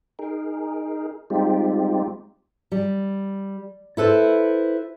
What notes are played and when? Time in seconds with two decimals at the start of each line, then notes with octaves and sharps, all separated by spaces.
0.19 D#4 G#4 A#4
1.30 G3 G#3 C4 D#4 F4 G4
2.72 G3
3.97 E4 A4 B4 C5